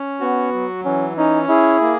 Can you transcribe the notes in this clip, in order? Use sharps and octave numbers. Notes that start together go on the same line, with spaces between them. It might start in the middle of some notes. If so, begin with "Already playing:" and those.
Already playing: C#4
B3 F#4
F#3
E3 C#4
C#4 D#4
E4 G#4
A#3